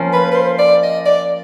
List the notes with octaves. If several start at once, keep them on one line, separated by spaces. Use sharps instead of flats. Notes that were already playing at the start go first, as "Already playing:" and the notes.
Already playing: F3 A#3 C#4
B4
B4
C5
D5
D#5
D5